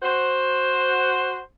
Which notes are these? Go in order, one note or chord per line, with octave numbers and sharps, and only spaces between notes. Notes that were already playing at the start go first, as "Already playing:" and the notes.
F#4 C5